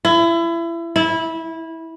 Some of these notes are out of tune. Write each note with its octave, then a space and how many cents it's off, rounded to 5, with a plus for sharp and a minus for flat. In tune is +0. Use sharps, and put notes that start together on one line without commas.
E4 +30
E4 -15